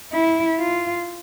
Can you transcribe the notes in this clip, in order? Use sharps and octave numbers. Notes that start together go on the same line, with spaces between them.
E4
F4